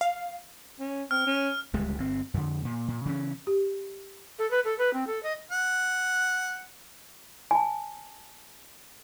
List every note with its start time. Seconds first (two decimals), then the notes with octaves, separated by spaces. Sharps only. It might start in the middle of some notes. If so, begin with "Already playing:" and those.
0.01 F5
0.79 C#4
1.11 C4 F6
1.26 C#4
1.73 D1 C#2 G3 G#3
1.98 G1 C4
2.34 F2 D3
2.65 A#2
2.88 A#2
3.05 C#3 E3 C#4
3.47 G4
4.39 A4
4.51 B4
4.65 A4
4.78 B4
4.93 C4
5.07 A4
5.23 D#5
5.51 F#5
7.51 G#5 A5